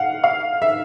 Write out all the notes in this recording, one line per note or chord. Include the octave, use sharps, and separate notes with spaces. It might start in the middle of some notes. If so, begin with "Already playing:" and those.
Already playing: F5 F#5
F5
E5